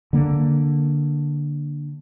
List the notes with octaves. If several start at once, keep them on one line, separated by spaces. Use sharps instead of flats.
D3 A#3